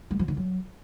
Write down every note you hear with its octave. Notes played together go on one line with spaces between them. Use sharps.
G#3
F3
D#3
F#3